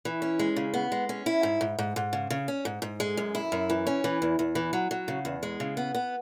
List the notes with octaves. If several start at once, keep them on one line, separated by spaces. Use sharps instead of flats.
E3
C#4
G#3
C#3
B3
G#3
C#4
E4
G#2
G#2
G#2
G#2
C#3
C#3
C#4
G#2
G#2
G#3
F#2
E4
F#2
E3
C#4
E3
E2
E2
E3
F#3
F#3
C#3
E2
G#3
C#3
B3
B3